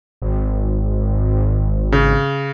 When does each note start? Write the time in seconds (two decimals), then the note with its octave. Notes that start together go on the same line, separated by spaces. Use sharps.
0.22 G#1
1.92 C#3